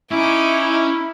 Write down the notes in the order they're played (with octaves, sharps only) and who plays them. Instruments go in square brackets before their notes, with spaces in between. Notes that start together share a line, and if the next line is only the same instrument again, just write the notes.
[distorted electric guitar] C#4 [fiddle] D#4 D6 [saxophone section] E4